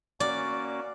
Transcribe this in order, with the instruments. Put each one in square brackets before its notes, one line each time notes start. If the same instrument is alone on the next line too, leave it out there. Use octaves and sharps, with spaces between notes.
[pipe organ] A#3 C#4 F#4 [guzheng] D5